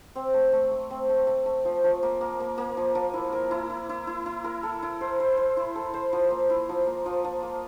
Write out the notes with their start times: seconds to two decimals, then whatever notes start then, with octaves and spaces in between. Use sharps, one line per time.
0.16 C4
0.34 A3
0.52 A3
0.71 A3
0.90 C4
1.09 A3
1.27 A3
1.46 A3
1.65 F3
1.84 F3
2.03 A#3
2.21 A#3
2.40 A#3
2.58 A#3
2.77 F3
2.95 F3
3.14 E4
3.33 A#4
3.51 E4
3.70 E4
3.89 E4
4.07 E4
4.26 E4
4.44 A#4
4.63 A4
4.83 E4
5.01 C5
5.20 C5
5.37 C5
5.57 E4
5.76 A4
5.94 C5
6.13 F3
6.31 A#3
6.50 E4
6.69 F3
6.87 A#3
7.06 F3
7.24 F3
7.43 A#3